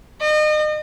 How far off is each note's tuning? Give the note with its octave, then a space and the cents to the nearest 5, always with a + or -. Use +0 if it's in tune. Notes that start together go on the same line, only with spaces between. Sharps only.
D#5 -35